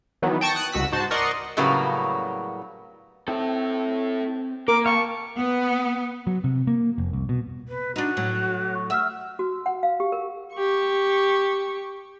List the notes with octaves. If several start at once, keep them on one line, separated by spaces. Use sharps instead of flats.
D#3 E3 F#3 B3
G5 A5 C#6 A#6 D7
D#6 F#6 C#7 D#7
C#2 F#4 E6 B6
G#2 F#4 C5 A5
A#4 D5 D#5 F#5 C6 C#6
A2 C#3 F#3 G3 A#3 B3
C4 E4 A4
A#3 A#4 D6
F5 G5 A5 C#6
B3
F#3
C3
A#3
F1
C2
B2
B4
D4 D#4 F#4
A2 F#3
C#6
E5 F#5 E6 F6
F#4
F#5
F5
G4
A#4
G4 C#6